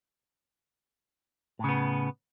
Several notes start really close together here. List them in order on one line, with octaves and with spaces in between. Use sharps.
A2 C#3 B3